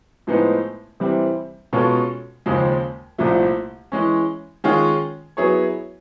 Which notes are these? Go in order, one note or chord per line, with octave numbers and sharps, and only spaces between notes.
A2 F3 G#3 B3 D#4
C3 E3 G3 C4
B2 G#3 C#4 F4 A4
D#2 C#3 F3 G#3
C2 A#2 F3 A3
E3 G#3 C#4
D#3 G#3 C#4 F4 G#4
F#3 B3 E4 G#4 C#5